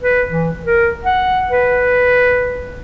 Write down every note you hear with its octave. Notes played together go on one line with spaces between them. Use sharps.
B4
E3
A#4
F#5
B4